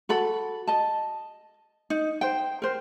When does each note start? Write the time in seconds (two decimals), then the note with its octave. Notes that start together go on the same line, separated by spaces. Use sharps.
0.09 F#4 A4 B5
0.67 D#5 A5
1.90 D#4
2.21 C5 G5
2.62 A#4 C5